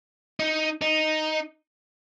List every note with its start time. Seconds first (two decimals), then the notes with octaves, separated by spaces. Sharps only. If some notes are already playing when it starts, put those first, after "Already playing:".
0.40 D#4
0.81 D#4